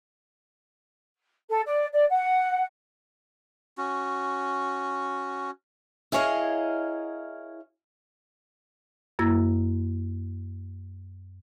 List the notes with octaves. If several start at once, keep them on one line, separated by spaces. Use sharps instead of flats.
A4
D5
D5
F#5
C#4 F#4
E4 G#4 A#4 C#5 D#5 F5
F#2 A#3 E4 E6 G#6 A#6